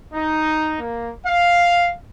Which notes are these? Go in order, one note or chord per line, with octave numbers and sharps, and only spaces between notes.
D#4
A#3
F5